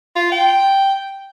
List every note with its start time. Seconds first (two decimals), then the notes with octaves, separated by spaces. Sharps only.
0.16 F4
0.32 G5